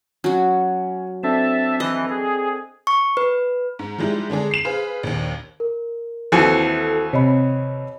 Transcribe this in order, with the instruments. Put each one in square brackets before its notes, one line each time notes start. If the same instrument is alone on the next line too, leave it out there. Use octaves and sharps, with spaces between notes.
[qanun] F#3 F#4 [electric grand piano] C#4
[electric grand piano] C4 D4 A4 [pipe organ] E5 A5
[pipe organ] E3 [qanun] D#5
[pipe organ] G#4
[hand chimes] C#6
B4
[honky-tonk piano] G#2
F3 G3 G#3 D#4 E4
D3 G#3 D4 G#4
C7 E7
G#4 B4 C5 F5
A#1 D#2
[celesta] A#4
[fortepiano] D#2 E3 C4 [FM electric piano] E4 F#4 A4 [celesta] C#7
[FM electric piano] C3 [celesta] C#5 D#5 B5